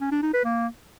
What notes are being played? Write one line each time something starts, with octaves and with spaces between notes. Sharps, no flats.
C#4
D4
D#4
B4
A#3